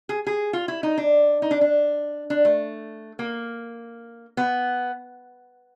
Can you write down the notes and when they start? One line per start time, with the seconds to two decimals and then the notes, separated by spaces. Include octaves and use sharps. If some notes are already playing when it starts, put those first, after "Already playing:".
0.09 G#4
0.27 G#4
0.53 F4
0.68 E4
0.83 D#4
0.98 D4
1.42 D#4
1.51 D4
1.61 D4
2.30 D4
2.45 A3
3.19 A#3
4.37 B3